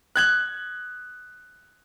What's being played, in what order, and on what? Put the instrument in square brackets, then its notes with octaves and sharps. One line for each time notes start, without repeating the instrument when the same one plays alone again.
[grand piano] F#6 G#6 F#7